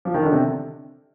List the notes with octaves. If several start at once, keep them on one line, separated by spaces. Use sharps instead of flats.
F3
D#3
D3
C3